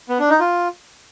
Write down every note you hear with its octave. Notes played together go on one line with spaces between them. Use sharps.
B3
D4
D#4
F4